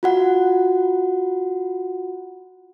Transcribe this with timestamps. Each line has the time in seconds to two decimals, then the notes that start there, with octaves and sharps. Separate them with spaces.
0.03 F4 F#4 F#5